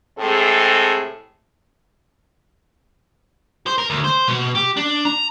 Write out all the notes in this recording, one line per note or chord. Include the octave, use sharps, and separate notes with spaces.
A2 C3 G#3 C4 G#4 A4
C5
A#4
D2
C5
B2
G4
D4
A#5